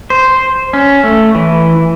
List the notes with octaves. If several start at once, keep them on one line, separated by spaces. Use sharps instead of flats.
C5
C#4
A3
E3